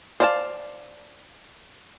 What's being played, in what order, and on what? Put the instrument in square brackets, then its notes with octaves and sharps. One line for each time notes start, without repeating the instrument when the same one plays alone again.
[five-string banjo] C5 D5 F5 F#5 A5